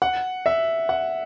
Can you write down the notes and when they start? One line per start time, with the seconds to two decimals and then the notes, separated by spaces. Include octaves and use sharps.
0.02 F#5
0.46 E5
0.89 F#5